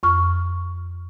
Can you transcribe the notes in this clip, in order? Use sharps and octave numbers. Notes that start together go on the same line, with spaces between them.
F2 C#6 F6